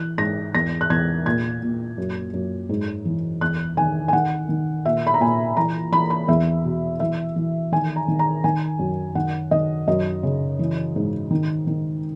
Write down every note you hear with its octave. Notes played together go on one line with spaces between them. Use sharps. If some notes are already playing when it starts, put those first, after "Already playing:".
Already playing: E3 F#6
G#2 A#6
E2 A#6
F#6
E2 G#6
A#2 G#6
A#2
F#2
F#2
G#2
E3
E2 F#6
D#3 G#5
G#5
D#3 F#5
D#3
A#2 E5
B5
A#5
A#2 G#5
E3 A#5
E3 B5
B5
E2 E5
B2
E3 E5
E3
D#3 G#5
A#5
D#3
A#5
D#3 G#5
F#2
D#3 F#5
D#3 D#5
F#2 D#5
C#3
E3
G#2
D#3
D#3